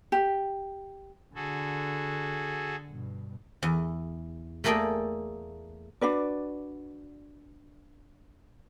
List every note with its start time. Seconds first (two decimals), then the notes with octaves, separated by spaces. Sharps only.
0.12 G4
1.35 D3 F#4 G#4 A4
2.90 G2 B2
3.63 E2
4.64 A3 A#3 G#4 A4 D5 G5
6.01 D4 F#4 B4 D5